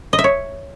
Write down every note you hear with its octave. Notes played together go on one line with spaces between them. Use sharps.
D#5
E5
C#5